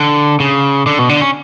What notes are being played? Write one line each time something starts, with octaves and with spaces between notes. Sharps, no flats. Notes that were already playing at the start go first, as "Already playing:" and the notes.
Already playing: D3
C#3
D3
B2
D3
C#4